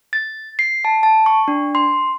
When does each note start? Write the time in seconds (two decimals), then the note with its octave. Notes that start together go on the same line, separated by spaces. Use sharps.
0.13 A6
0.59 C7
0.85 A5
1.03 A5
1.26 C#6
1.48 D4
1.75 C6